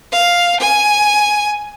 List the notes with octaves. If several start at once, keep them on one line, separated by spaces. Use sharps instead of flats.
F5
G#5